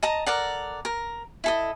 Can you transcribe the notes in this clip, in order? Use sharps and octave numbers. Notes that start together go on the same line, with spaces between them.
D#5 A5 A#5
A4 A#4 D5 F#5
A#4
E4 A4 D#5